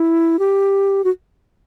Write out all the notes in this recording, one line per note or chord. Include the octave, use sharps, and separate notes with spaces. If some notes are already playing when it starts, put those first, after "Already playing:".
Already playing: E4
G4
F#4